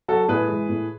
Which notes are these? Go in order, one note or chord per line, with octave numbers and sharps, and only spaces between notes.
F#3 F#4 A4
A2 G#4 B4
E3 G#3
A2